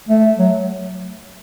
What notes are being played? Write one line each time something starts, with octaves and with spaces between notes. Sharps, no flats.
A3
F#3